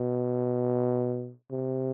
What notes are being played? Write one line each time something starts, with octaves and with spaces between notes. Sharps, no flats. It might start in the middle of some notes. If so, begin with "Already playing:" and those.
Already playing: B2
C3